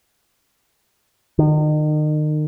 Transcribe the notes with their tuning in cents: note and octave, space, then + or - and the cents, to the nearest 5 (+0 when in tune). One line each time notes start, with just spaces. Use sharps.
D#3 -35